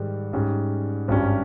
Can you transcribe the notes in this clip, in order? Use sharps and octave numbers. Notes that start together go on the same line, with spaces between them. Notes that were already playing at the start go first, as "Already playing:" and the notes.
Already playing: G#2 D#3 G3
G#2 G3 C#4
G#1 G2 G3 C#4 G4